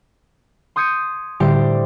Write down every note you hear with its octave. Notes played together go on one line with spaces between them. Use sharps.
C6 D#6 G6 G#6 C#7 D#7
A2 D3 G3 G4 C5 D6